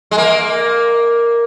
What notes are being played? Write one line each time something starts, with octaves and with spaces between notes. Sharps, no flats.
G#3
A#3